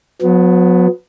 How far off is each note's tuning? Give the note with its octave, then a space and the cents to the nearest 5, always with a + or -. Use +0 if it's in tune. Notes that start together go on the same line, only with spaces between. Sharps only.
F#3 -40 B3 +10